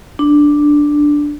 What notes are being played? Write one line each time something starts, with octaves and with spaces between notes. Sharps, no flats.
D4